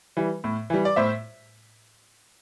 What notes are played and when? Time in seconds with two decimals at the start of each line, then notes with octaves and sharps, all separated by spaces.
0.17 E3 G3
0.44 A2
0.70 E3 G3
0.85 D5
0.96 A2 C5 E5